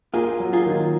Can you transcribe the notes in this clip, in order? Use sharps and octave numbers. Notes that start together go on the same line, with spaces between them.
A#3 F4 G#4
F#3
F4 G#4
D#3